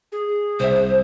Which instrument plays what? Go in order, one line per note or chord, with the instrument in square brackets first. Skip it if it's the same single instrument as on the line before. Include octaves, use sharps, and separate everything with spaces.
[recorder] G#4
[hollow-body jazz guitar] C2 E5 [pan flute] C5